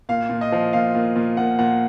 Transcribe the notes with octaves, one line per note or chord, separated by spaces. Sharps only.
A#2 F5
A#2
D#5
F3
A#2 F5
A#2
A#2
A#2 F#5
A#2 F#5